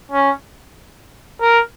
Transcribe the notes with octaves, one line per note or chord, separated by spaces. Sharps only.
C#4
A#4